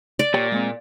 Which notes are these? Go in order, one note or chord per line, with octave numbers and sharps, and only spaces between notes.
D5
A#2 G4 C#5 G5
G#3 A#3 C4